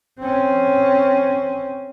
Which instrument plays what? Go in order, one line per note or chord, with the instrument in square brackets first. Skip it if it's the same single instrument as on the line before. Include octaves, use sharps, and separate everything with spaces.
[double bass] C4 C#4